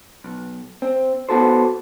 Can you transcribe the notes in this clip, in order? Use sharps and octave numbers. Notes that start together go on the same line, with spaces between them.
B1
C4
B3 F#4 A4 C5